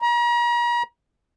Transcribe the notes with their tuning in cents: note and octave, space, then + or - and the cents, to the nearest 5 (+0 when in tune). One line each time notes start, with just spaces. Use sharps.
A#5 +40